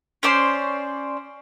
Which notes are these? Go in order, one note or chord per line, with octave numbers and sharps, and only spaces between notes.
C#4 C5 D5 C6